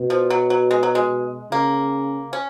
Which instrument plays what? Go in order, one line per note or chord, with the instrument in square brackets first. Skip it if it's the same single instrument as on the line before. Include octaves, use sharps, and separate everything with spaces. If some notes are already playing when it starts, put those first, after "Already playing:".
Already playing: [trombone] B2
[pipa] F3
F#3
F#3
G#3
F#3
G#3
[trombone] C#3 [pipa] A#3
[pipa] C#4